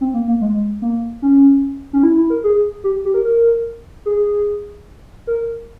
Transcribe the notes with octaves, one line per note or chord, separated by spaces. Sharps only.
C4
A#3
A#3
G#3
A#3
C#4
C#4
E4
E4
A#4
G#4
G4
G4
A#4
A#4
G#4
A#4